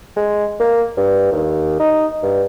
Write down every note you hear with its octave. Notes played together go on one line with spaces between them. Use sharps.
G#3
A#3
G2
D#2
D#4
G2